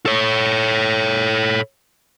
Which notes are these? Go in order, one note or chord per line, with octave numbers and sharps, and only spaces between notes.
A4 C#5